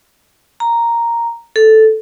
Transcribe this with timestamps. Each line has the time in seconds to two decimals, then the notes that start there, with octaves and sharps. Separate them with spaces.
0.60 A#5
1.56 A4